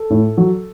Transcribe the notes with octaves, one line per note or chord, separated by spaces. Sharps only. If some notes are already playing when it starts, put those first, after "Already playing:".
Already playing: A4
A2
F#3